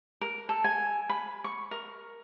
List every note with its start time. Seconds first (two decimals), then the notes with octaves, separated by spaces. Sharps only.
0.21 A#4
0.49 A4
0.64 G#5
1.09 B5
1.44 C#6
1.71 A#4